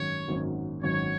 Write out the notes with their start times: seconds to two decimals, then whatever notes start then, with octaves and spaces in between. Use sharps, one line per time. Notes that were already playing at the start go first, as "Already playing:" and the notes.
Already playing: G#1 F#2 D#3 F#3 C#5
0.28 G#1 F#2 D#3 F#3
0.83 G#1 F#2 D#3 F#3 C#5